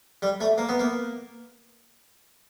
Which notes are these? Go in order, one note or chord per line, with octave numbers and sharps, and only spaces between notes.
G3
A3
A#3
B3
A#3